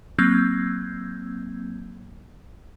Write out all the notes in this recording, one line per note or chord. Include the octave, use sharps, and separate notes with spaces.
F#3 A#3 C4 E6 G6 G#6